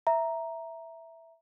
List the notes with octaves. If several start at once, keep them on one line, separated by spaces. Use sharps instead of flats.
E5 A#5